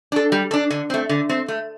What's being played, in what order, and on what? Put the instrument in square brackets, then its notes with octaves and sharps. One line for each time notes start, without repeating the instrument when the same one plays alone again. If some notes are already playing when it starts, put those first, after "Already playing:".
[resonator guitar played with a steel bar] D4 A4
G3
D4 A4
D3
A3 C4
D3
A3 C4
A3